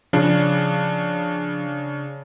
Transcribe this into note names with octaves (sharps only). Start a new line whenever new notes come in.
C#3 F3 D4